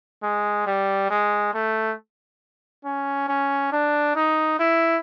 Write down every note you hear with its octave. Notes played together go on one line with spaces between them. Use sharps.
G#3
G3
G#3
A3
C#4
C#4
D4
D#4
E4